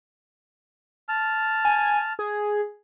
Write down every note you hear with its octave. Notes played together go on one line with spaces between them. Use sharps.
A5 F6
G#5
G#4